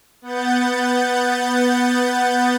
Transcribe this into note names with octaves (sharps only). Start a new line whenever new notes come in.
B3 F#5 G6 A6